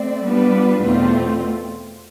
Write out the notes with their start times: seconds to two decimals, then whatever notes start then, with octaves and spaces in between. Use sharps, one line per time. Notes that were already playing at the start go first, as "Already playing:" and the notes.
Already playing: A3 C4 D5
0.24 G3 B3 D4 F4 B4
0.82 E2 B2 A3 C4 F4